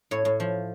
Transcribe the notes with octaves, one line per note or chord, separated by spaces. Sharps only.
A2 C#5
A2
F3